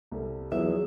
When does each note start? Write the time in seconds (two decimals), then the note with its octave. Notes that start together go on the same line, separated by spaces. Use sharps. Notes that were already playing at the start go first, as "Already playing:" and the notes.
0.12 C2 G3 A4
0.52 E2 F3 F#3 G#4 E5